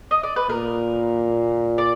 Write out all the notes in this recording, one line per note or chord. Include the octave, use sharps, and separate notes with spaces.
D#5
D5
B4
A#2 A#4
D5